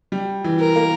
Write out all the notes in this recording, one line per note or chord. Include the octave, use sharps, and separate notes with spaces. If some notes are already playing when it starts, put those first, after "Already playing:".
G3
E3
A#4
A#3